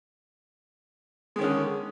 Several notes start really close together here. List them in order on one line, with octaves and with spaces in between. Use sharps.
G#3 D#3 C#4 D3